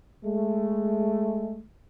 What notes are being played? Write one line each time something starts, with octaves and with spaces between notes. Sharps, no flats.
G#3 A3